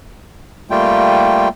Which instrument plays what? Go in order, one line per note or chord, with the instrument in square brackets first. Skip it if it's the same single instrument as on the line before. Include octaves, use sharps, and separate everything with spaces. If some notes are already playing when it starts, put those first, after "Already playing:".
[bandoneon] G3 A3 A#3 F4 G5